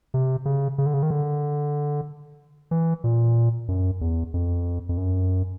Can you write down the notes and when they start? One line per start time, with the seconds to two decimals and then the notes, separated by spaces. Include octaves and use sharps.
0.14 C3
0.45 C#3
0.78 C#3
0.86 D3
0.94 C#3
1.03 D#3
1.10 D3
2.71 E3
3.04 A#2
3.68 F#2
4.01 E2
4.34 F2
4.89 F2
4.97 F#2